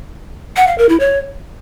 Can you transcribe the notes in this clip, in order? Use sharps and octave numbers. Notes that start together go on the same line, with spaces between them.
F#5
F5
A#4
E4
C#5